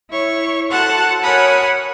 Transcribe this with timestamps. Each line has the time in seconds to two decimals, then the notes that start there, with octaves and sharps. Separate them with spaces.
0.11 E4 C#5 C#6
0.70 F#4 A4 C5 F#5 A5 F#6
1.22 A#4 C#5 F#5 G#5 B5 D#6